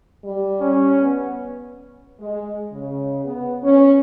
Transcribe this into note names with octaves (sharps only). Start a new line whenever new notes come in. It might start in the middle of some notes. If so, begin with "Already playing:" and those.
G3
C#4
B3
G#3
C#3
B3
C#4